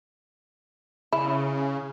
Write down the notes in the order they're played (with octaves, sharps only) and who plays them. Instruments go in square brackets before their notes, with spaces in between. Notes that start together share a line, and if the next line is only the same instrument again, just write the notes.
[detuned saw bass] C#3 [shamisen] E4